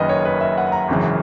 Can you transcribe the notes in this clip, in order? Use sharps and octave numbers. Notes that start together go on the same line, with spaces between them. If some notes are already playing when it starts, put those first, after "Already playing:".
Already playing: F#1 F#2 D#3 A#4 B4 D#5
C#5
B4
E5
F#5
A#5
G#1 F#2 C#3 E3